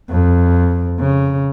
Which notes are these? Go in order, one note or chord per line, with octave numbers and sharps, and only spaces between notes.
F2
C#3